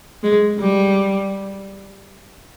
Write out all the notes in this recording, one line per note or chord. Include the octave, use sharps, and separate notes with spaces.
G#3
G3